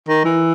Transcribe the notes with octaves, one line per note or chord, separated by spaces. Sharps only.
D#3
E3